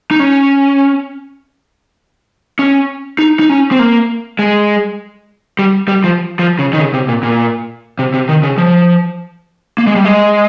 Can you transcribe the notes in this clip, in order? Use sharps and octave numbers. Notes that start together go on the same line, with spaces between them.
D#4
C#4
C#4
D#4
D#4
C#4
C4
A#3
G#3
G3
G3
F3
F3
C#3
D#3
C#3
C3
A#2
A#2
C3
C3
D#3
C#3
F3
A#3
G#3
G3
G#3